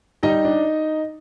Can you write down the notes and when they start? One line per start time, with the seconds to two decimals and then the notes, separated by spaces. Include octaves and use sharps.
0.23 G3 D#4 D#5
0.45 D4